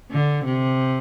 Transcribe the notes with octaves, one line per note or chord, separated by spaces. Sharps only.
D3
C3